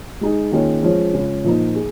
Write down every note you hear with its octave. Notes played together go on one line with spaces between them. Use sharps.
G#3 D#4 G#4
D#3 A#3 C#4 F4 G#4
F3 G#3 C#4
C#3 G#3 C#4 F4
A#2 F3 A#3 D#4
G#4